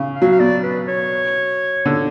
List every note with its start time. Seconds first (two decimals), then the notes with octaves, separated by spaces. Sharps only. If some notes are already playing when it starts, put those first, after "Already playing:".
Already playing: C#3
0.15 F5
0.22 F#3
0.32 F5
0.40 B2 D5
0.64 B4
0.88 C#5
1.85 D3